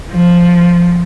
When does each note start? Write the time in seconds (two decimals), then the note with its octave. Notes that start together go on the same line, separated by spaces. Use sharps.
0.12 F3